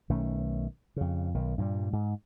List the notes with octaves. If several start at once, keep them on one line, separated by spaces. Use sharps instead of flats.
B1 D#3 A3 C#4
F2 C#3
B1 D#3
G2 A#2 C#3 G3
G#2